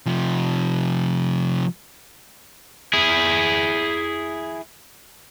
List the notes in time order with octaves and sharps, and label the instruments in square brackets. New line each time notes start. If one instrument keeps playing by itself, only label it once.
[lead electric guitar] C3 F3
[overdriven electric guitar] E4 G#4